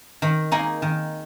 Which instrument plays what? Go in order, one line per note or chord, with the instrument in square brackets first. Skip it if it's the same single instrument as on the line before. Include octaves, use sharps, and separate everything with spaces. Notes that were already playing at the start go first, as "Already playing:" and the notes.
[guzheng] D#3
A#3 D#4 G#4
D#3